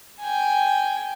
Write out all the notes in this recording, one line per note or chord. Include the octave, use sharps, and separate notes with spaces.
G5 G#5